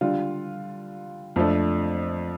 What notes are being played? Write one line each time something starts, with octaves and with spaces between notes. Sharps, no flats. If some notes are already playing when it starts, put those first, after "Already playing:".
D3 G3 F4
F2 F3 A3 D4